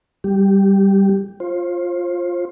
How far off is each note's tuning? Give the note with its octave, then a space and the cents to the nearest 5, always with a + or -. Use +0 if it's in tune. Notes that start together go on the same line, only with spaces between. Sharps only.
G3 +0 G4 +0
F4 +0 C5 +25